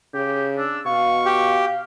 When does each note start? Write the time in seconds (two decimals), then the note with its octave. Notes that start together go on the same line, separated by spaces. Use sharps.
0.14 C#3 G4
0.57 D4 E6
0.86 B2 F5 C#6
1.25 G4